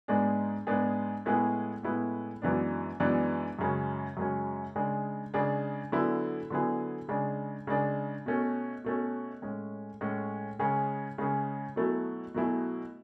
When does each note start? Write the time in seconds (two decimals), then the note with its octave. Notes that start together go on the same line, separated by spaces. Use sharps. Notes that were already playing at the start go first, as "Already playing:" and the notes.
0.08 G#2 G#3 B3 D4 G#4
0.67 G#2 G#3 B3 D4 G#4
1.26 A2 G#3 B3 E4 G#4
1.83 A2 G#3 B3 E4 G#4
2.42 F#2 E3 G#3 B3 D4
3.00 F#2 E3 G#3 B3 D4
3.59 F#2 C#3 G#3 C#4
4.17 F#2 C#3 G#3 C#4
4.76 C#3 G#3 D4 G#4
5.34 C#3 G#3 D4 G#4
5.92 D3 F#3 B3 E4 G#4
6.50 D3 F#3 B3 E4 G#4
7.09 C#3 G#3 D4 G#4
7.67 C#3 G#3 D4 G#4
8.26 B2 A3 C#4
8.84 B2 A3 C#4
9.42 A2 G#3 C#4
10.01 A2 G#3 C#4
10.59 C#3 G#3 C#4 G#4
11.18 C#3 G#3 C#4 G#4
11.76 B2 F#3 A3 E4 G#4
12.34 B2 F#3 A3 E4 G#4